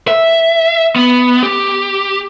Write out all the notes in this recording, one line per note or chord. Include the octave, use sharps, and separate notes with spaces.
E5
B3
G4